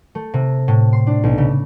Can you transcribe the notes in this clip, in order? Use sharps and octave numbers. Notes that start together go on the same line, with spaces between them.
A3
C3
A2
C6
D4
B1
C#3